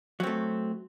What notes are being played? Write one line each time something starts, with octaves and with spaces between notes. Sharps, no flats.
F#3 A3 C4